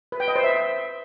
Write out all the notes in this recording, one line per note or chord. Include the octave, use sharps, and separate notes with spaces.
B4
G5
D#5
C5
E5